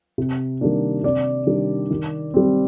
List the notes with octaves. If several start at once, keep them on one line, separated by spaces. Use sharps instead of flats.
C3
D#3 G3 A#3 D4
C3 D5
D#3 G3 D4
D#3
G3 C4